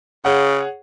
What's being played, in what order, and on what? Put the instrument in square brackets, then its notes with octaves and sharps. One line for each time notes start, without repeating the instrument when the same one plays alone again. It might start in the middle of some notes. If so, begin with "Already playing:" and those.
[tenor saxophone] C#3 [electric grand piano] G#4 C#5 F#5